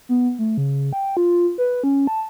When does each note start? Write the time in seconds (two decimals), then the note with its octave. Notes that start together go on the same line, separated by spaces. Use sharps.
0.09 B3
0.39 A3
0.58 C#3
0.93 G5
1.17 F4
1.58 B4
1.84 C#4
2.07 A5